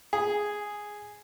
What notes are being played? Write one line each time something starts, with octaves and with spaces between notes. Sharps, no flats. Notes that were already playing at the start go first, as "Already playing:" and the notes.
G#4